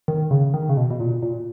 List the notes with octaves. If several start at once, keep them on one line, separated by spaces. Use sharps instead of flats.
D#3
C#3
D#3
C#3
B2
B2
A#2
A#2